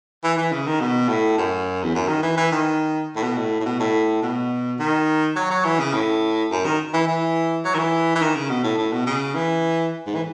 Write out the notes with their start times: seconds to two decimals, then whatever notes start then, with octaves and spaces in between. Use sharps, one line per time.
0.24 E3
0.37 E3
0.52 C#3
0.67 D#3
0.80 B2
1.09 A2
1.38 F#2
1.83 E2
1.95 F#2
2.08 D#3
2.23 E3
2.37 E3
2.52 D#3
3.16 A2
3.23 B2
3.38 A2
3.60 A2
3.65 B2
3.80 A2
4.23 B2
4.79 D#3
5.36 F#3
5.51 F#3
5.64 E3
5.79 C#3
5.93 A2
6.51 F#2
6.65 D#3
6.93 E3
7.07 E3
7.64 F#3
7.74 D#3
7.78 E3
8.15 E3
8.22 D#3
8.36 C#3
8.50 B2
8.64 A2
8.78 A2
8.93 B2
9.07 C#3
9.35 E3
10.06 G#2
10.15 E3